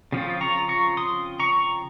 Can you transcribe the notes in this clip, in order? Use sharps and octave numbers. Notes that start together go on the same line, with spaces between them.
C#3 F3 C4 F4
A#5 C#6
A#5 C#6
C6 D#6
A#5 C#6